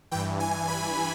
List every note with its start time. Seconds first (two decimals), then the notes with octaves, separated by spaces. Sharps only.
0.11 G2 E3 G5
0.40 G#5
0.68 B5